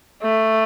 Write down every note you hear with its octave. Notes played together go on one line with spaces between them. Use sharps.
A3